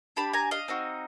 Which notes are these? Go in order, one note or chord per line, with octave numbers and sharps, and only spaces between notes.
D4 G4 A5 B5
G#5 A#5
D#5 F5
C4 D#4 F#4